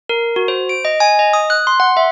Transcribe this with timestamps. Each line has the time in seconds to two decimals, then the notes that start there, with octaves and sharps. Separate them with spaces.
0.09 A#4
0.36 F#4
0.48 C5
0.69 D7
0.85 D#5
1.00 G#5
1.19 D#5
1.33 D#6
1.50 F#6
1.67 C6
1.80 F#5
1.97 E5